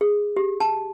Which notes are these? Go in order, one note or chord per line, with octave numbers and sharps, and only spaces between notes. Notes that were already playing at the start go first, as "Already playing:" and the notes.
G#4
G4
A5